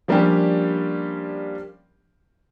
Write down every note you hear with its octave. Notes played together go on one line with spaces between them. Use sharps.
F3 G3 A#3 C#4 D4 G4